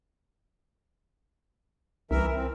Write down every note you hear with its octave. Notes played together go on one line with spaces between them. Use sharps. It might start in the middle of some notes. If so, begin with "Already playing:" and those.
C2 E3 A#4 E5
C4